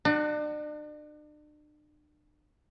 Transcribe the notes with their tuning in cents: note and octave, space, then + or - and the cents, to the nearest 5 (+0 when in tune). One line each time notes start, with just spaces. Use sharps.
D4 +40 F#4 +0